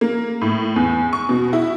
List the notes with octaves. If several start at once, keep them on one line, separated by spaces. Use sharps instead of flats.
A#3
A2
E2
C#6
B2
E4